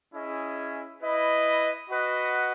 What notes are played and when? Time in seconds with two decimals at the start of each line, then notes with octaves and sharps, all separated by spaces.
0.13 C#4 E4 G#4 D#5
1.02 E4 B4 D#5
1.89 F#4 B4 D#5 F#5